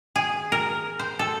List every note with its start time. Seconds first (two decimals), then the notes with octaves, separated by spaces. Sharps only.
0.16 G#4
0.52 A#4
0.99 C5
1.19 A4